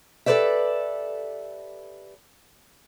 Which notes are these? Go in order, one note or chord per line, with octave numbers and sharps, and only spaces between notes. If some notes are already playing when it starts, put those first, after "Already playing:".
G4 A4 B4 C5 D5 E5